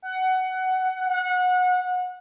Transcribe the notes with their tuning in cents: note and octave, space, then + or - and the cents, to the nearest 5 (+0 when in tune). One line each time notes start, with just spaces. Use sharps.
F#5 +15
F#5 -30